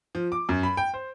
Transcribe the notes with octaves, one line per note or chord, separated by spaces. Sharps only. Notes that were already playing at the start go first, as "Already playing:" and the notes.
F3
D6
F#2
B5
G5
C5